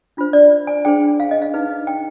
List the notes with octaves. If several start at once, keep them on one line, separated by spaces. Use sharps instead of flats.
D4 F4 C5
D5
G#5
D4 G#4 C5 G5
F5
D#5
F5
D#4 G#4 B4
G5